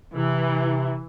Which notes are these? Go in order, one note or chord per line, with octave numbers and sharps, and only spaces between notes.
C3 E3